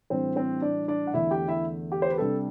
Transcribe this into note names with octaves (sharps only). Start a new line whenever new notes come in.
A2 E3 G3 C4 D4 C5
C4 C5
D4 D5
D4 D5
F#5
E2 D3 A3 E4 E5
G4 G5
E4 E5
G4
C5
B4
C3 G3 D4 A4